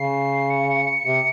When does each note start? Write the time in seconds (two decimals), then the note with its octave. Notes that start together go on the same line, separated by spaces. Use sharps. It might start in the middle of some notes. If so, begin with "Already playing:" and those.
Already playing: C#3 C7
0.49 C#7
1.06 C3